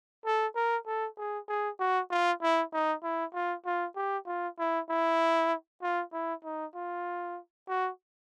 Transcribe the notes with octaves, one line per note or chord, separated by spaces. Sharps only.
A4
A#4
A4
G#4
G#4
F#4
F4
E4
D#4
E4
F4
F4
G4
F4
E4
E4
F4
E4
D#4
F4
F#4